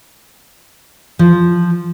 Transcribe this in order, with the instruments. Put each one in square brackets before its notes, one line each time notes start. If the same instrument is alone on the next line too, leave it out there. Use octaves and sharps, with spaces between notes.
[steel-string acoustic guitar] F3